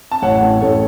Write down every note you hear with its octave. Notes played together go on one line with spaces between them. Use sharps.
A5
A1 C#5 F#5
A1
A1 A4 C#5